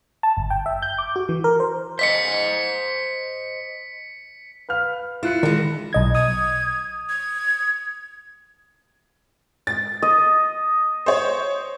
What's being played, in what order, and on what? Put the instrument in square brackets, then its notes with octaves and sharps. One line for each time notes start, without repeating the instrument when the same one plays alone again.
[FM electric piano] A5
G1
G5
E5
G6
D6
F#4
E3
A#4
C5
[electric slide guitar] C5 D#5 [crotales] B6 C#7
[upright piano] B4 F5 F6
[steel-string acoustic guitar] E4 [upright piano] F4 F#6 C#7
[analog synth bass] D#3 [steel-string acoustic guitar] E3 G#3
[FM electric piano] B1 D#5 G#6
[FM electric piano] D#6 [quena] G#6
[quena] G#6
[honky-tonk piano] A6
[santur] D#5
[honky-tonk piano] C5 C#5